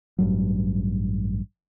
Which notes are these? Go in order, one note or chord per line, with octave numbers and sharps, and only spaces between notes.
A1 G2 F#3